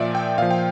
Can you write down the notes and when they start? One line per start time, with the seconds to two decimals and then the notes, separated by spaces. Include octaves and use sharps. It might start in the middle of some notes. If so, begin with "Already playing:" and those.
Already playing: A#2 F3 D5 E5
0.15 G5
0.38 A#2 F3 F5
0.51 G5